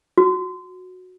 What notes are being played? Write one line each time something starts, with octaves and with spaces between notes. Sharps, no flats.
F#4